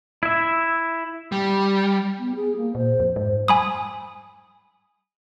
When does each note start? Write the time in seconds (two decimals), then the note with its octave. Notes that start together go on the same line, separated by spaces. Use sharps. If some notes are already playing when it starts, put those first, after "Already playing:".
0.23 E4 E5
1.32 G3
2.18 B3
2.35 G#4
2.56 A#3
2.75 A#2 C5
3.00 F2
3.16 G#2 C5
3.48 G#5 B5 D#6